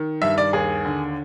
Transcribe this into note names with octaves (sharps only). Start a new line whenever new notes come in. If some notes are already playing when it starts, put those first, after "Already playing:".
Already playing: D#3
G2 E5
D5
D#2 G#4
D3